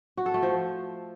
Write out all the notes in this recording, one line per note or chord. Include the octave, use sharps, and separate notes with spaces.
F#4
A4
A3
F3